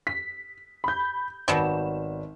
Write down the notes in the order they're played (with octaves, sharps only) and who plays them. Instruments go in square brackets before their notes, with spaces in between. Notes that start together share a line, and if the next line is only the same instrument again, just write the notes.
[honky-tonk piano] B6
B5 G6
[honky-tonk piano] G#1 E7 [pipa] B2 F#3 G3